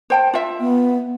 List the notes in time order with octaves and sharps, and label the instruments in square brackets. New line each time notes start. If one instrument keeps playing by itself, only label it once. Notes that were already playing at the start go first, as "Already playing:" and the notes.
[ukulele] C5 G5 A5
F4 E5
[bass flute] B3